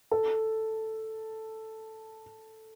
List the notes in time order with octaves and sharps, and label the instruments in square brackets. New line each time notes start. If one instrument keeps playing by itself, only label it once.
[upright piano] A4